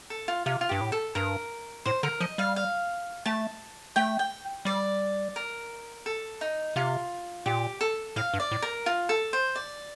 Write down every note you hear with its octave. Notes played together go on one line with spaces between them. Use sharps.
A4
F4
C3 F4
F4
G2 G4
A2
A4
G2 A#4
A2 C5
D3 A#4
F3 D#5
G3 F5
F5
A3 A5
A3 G5
G5
G3 D5
A#4
A4
D#4
C3 F4
A#2 G4
A4
A2 F5
G2
D5
A2
A#4
F4
A4
C5
D5